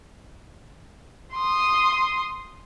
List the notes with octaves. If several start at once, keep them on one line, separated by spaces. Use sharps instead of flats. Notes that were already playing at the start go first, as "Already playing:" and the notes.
C6 D#6